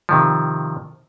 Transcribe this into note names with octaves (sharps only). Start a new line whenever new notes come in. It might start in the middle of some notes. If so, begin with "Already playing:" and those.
C3 D#3 F3